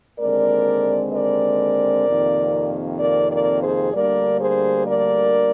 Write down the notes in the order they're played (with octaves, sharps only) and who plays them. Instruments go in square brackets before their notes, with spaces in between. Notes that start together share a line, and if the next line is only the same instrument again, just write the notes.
[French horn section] D#2 D3 G#3 C4 A#4 D5
A#4 D5
F2 C3 D#3 A#3
A#4 D5
A#4 D5
G#4 C5
D2 D3 G3 A#3 A#4 D5
G#4 C5
A#4 D5